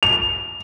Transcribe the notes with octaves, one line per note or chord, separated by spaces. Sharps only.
F7